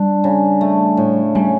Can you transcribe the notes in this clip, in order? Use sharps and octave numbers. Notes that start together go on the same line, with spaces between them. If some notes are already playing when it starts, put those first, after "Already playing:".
Already playing: G3 D4
C#3
A3
A2
G3 C#4